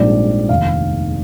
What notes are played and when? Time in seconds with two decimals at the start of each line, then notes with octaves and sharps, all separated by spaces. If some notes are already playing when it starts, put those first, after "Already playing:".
Already playing: A#1 G#2 G3 C4 D5
0.49 F1 D#2 D#3 F5